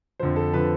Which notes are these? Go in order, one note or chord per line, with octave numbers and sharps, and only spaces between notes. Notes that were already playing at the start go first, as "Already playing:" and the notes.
F2 D3 F3 C5
A4
D3 F3 B4